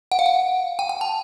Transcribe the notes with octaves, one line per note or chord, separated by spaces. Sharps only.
F#5
F5
F#5
G5
G5
A5